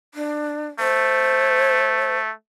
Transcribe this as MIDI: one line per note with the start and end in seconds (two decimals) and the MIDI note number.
0.14 0.68 62
0.80 2.32 57
0.80 2.17 72